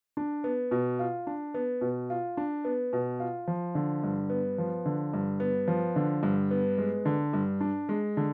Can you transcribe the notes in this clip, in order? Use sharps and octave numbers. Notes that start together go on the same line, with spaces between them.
D4
B3
B2
F4
D4
B3
B2
F4
D4
B3
B2
F4
F3
D3
G2
B3
F3
D3
G2
B3
F3
D3
G2
B3
G#3
D3
G2
D4
G#3
D3